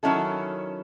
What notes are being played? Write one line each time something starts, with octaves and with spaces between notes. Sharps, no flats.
D#3 F#3 C#4 E4 A4